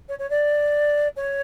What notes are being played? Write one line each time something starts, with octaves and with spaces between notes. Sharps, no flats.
C#5
C#5
D5
C#5